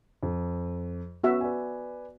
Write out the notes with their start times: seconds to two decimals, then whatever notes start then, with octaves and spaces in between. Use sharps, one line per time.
0.23 F2
1.24 B3 C#4 F#4 E5
1.41 B4 D5 G#5